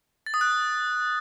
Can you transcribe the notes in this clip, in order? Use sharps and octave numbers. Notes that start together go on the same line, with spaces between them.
A6
D#6
F#6